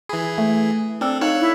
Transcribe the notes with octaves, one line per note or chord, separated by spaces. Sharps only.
E3 G#4 B5
A3
C4 D4 A4
D#4 A4 C#5 F5 E6 F#6
E4